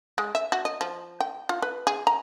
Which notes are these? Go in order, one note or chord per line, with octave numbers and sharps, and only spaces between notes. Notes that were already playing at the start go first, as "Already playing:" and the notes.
G#3
E5
F#4
D#5
F3
G5
F4
B4
G#4
A#5